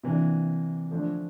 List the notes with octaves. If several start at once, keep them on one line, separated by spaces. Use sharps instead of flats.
C3 E3 A#3 D4
D3 F3 A3 D4